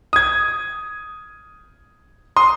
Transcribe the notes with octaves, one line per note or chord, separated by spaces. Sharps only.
D#6 G#6
C6 D#6